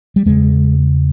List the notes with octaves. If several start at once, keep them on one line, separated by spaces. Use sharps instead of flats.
G3
E2 C#3 G#3